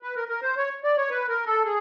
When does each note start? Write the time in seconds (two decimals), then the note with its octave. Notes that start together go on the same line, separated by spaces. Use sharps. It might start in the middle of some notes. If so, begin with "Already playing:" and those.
0.02 B4
0.16 A#4
0.28 A#4
0.42 C5
0.57 C#5
0.84 D5
0.97 C#5
1.10 B4
1.29 A#4
1.46 A4
1.65 G#4